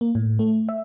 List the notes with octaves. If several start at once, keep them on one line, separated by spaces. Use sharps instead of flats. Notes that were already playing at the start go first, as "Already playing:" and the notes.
A#3
A2
A3
E5